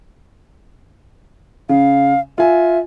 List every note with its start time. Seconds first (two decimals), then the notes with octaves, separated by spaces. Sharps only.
1.69 C#3 F5
2.38 F4 E5 G#5